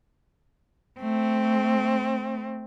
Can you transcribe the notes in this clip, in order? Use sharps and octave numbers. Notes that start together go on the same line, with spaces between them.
A3 C4